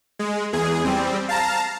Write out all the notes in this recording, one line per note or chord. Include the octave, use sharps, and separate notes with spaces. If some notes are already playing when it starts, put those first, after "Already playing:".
G#3
E2 G#4
G3 C4
F5 A5 A#5